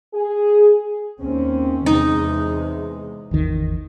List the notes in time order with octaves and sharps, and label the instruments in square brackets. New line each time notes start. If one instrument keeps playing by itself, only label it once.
[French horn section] G#4
[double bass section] D#2 C4 C#4
[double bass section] E2 C3 G#3 [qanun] D#4
[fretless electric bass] G#1 E2 D#3